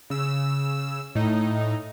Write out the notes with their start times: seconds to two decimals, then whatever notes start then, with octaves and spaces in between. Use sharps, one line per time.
0.10 C#3 E6
1.15 A2 D#4